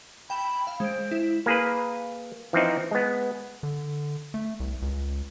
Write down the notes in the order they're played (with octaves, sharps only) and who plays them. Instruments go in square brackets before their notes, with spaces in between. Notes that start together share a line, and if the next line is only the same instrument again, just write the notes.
[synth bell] G5 E7 [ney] B5
[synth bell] F5
[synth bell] G#3 D7 [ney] C5
[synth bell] E4
[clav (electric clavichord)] A#3 G#4 B4
E3 F3 C4 D#4
G#3 B3
[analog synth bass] D3
A3
C2
C#2